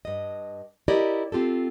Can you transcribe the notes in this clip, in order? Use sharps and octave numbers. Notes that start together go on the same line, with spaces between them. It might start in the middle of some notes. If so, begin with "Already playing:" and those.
G2 D#5
E4 G4 A#4 D5 D#5
C4 F4 G4 A4